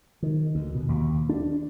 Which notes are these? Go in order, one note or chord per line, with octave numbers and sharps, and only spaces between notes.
D#3
D2
B2
D#2
D4